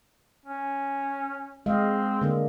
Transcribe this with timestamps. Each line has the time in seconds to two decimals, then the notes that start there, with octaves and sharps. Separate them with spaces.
0.46 C#4
1.66 G#3 C4 D#5 F5
2.21 D3 A#3 D4